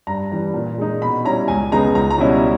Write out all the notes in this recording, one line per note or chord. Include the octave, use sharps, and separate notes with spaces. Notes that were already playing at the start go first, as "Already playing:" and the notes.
G2 A#5
E3 G3
A#2
G#3 D#4
B2 B5
G3 C#4 E4 A#5
C#2 G#5
C#3 G#3 B3 D#4 A#5
C#2 A#5
A#5
B2 G3 C#4 E4